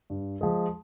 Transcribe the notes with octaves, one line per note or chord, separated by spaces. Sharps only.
G2
F3 G#3